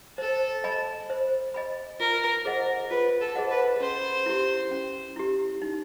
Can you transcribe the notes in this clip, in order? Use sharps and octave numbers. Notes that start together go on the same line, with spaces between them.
A4 C5
D#5 G#5 B5
C5
D#5 G#5 B5
F4 A#4
G#4 C5 D#5 F#5
F4 B4
A4
G#4 C5 D#5 F#5
B4
C#4 C5
E4 G4
C#4
E4 G4
D#4